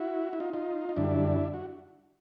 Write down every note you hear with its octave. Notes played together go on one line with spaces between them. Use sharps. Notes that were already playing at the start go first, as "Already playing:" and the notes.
Already playing: E4 F#4
E4
D#4 F4
D#4 F4
D#4
F#2 D3 G3 D4 E4
F#4